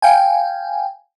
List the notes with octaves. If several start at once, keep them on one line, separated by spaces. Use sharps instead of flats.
F5 G5 G#5